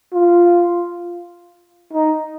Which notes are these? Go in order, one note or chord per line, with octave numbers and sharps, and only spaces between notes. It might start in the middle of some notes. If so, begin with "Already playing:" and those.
F4
D#4